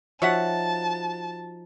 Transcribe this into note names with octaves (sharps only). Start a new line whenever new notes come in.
F3 D#4 F#4 C#5 E5 F#5 A5